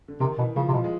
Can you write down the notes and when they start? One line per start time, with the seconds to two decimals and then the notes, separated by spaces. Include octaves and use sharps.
0.08 D3
0.20 C3 D#3
0.38 B2 E3
0.56 C#3 F3
0.69 C3
0.73 B2 F3
0.84 G#3